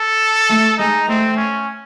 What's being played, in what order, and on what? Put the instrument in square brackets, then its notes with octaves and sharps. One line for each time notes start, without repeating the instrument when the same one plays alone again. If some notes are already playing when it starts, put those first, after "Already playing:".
Already playing: [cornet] A4
[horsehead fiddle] A3
[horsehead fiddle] G#3 [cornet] D#4
[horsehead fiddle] A3 [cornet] C4
[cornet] C#4